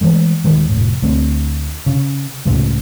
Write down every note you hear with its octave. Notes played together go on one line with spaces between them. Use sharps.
E3 G#3 A3
D#1 D#3 G#3
F1 A2
D2 A3 C4
C#3
C#2 A2 C#3 G#3